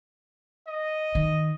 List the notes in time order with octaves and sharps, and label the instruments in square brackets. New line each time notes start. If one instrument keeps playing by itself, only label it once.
[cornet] D#5
[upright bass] D#3